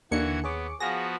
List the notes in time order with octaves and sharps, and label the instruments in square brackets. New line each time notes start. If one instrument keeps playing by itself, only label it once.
[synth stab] D#2 C#7 [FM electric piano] D3 A#3 D4 [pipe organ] E3 F#4 G#6
[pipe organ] B3 [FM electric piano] G#4 C#5 D6
[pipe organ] F3 B3 F#4 [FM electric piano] G#4 F5 [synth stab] A#6